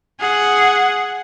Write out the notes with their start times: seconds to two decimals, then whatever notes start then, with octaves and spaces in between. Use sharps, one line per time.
0.20 G#4 F#5